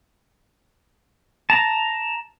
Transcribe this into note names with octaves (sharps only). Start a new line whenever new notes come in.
A5 A#5